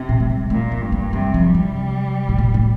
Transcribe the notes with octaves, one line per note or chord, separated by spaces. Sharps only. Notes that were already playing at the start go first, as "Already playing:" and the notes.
Already playing: C3
A#2
A3
G3
A#2 A3
C4
G2
A#3
C3 G3
F3
G3
C3
A2
A#2
A2